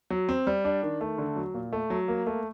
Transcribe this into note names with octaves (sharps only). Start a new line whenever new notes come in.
F#3
C4
G3
D4
D#3
A3
D3
F#3
A#2
A3
F#3
A#3
A3